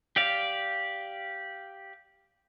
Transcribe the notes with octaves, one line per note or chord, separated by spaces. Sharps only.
G4 D5 F5